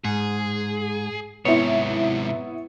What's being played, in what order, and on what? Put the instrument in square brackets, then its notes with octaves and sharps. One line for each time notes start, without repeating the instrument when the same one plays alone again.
[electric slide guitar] G#2 [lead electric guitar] G#4
[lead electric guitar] G#2 C3 [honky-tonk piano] B3 E4 [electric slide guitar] C#5